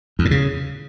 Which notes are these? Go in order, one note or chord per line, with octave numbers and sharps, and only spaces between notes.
E2
A2
C#3